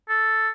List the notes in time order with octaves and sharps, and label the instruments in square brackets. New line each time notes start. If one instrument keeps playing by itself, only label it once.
[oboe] A4